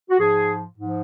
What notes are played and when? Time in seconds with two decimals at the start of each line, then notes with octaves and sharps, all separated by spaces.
0.10 F#4
0.18 G#2 F3 G#4
0.75 G#2 F3